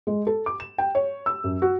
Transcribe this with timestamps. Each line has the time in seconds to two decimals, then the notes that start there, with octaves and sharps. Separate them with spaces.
0.07 G#3
0.27 A4
0.46 D6
0.60 E7
0.78 G5
0.95 C#5
1.26 E6
1.44 F#2
1.62 F#4